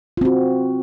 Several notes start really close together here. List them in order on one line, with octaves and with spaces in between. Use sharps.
F4 C4 F#4